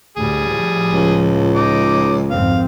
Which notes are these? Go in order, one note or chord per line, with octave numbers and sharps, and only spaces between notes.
D2 A2 G3 G#4
A2 F3
C#2
D#4 D6
G#1 F2 C4 F5